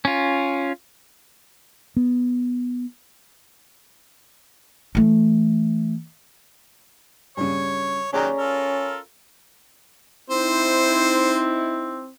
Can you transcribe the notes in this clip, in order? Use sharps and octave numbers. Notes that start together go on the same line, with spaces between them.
C#4 F4
B3
E3 A3
G2 C#3 C#5
D#3 F#3 C#4 G4 G#4 D5 A#5
F4 A4 A#4
C4 D#4 E4 C5